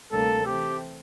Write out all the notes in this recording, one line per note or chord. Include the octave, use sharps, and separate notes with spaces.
D2 C3 G3 A#3 D4 A4
E3 A3 C4 G4